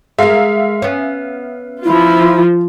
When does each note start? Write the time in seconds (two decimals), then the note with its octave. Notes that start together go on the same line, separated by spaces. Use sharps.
0.19 G#3 A#4 E5 F5
0.82 B3 C#4
1.84 F3 E4 F4